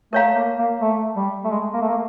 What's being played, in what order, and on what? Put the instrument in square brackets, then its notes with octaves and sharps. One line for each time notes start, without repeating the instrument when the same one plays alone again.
[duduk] A3 [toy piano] A#4 C#5 F5 A#5
[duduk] A#3
A#3
A3
G3
A3
G#3
A#3
A3
A#3